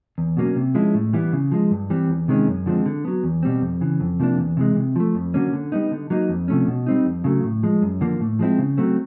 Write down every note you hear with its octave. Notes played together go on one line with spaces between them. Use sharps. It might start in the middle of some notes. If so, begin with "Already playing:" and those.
E2
B2 F#3 A#3 C#4
C3
F3 G#3 C#4 E4
A2
E3 G3 B3 E4
C#3
F3 G#3
G2
E3 G3 C4
E2
C3 D#3 G#3 C#4
F#2
D3 F3 G#3 C4
D3
F#3 B3
E2
B2 G3 C4
F2
C#3 E3
F2
C3 F3 A#3 D4
E2
C3 E3 G#3
C3
F3 A3
F2
D3 F#3 A#3 C#4
D3
G3 B3 D#4
D3
F#3 A#3 D#4
F2
C3 F3 A3 C#4
B2
G3 C4 D#4
F2
C#3 F#3 A3
A2
F3 G#3
F#2
D3 F3 A#3
A2
F3 G#3 C4 E4
C#3
F#3 A3 C4